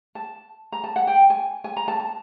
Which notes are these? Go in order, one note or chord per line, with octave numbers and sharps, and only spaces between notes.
A5
A#5
A5
F#5
G5
G#5
G#5
A#5
A5
A5